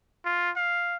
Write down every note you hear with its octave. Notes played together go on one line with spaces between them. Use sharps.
F4
F5